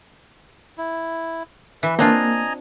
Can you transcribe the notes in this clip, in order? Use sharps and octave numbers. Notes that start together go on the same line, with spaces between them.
E4
E3 B4 E5
A#3 C4 D4 F4 D#5 G#5 A#5